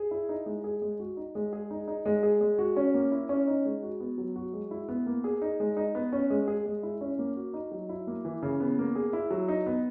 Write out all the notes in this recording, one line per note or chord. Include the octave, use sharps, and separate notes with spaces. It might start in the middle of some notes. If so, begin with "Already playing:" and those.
Already playing: G#4
E4
D#4
G#3
G#4
G#3
F#4
D#4
G#3
G#4
D#4
D#4
G#3
G#4
G#3
F#4
C#4
A#3
E4
C#4
D#4
G#3
F#4
B3
F#3
F#4
G#3
E4
B3
A#3
G#4
D#4
G#3
D#4
B3
C#4
G#3
G#4
G#3
E4
C#4
A#3
F#4
D#4
F#3
E4
A#3
E3
C#3
B3
A#3
G#4
E4
F#3
D#4
B3